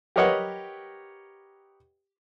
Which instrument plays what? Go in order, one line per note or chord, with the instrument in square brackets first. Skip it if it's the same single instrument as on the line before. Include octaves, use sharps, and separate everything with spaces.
[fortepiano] G4 A#4 B4 C#5 D#5 F#5